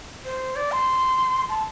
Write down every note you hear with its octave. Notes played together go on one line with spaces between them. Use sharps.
C5
D5
C6
A5